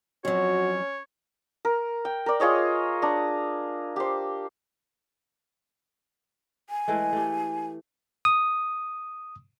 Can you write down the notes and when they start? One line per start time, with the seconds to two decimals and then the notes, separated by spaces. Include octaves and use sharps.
0.25 F2 F#3 C#4 F#4 C#5
1.65 A#4
2.05 G5
2.26 A#4 D5
2.40 F4 G#4 C#5 D#5
3.02 D4 A#5
3.96 G4 C5
6.70 G#5
6.88 E3 G#3 A3
7.13 A3 G4
8.25 D#6